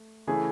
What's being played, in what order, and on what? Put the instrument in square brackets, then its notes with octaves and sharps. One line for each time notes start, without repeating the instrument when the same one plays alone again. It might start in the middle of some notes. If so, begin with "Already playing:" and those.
Already playing: [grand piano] A3
[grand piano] C#3 E3 A3 C#4 E4 [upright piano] G#4